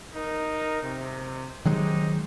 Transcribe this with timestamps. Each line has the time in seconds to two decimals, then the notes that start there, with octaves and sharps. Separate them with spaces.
0.14 D#4 A#4
0.82 C3
1.65 D#3 F#3 G#3 C4 D#4 G4